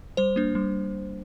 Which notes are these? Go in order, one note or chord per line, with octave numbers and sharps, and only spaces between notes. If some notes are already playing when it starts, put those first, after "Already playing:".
G3 C5
A#3 D4
G3